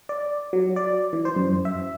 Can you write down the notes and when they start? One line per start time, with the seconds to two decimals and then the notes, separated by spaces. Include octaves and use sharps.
0.09 D5
0.53 F#3
0.76 D5
1.13 E3
1.25 C5
1.36 F#2
1.65 E5